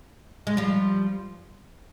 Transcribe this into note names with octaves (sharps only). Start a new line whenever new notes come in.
G#3
F3 G3